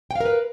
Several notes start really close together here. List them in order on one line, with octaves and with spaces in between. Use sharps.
G5 F5 A#4 B4